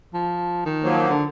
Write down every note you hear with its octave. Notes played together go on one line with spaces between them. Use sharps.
F3
D#3
F3 F#3 A#3
D3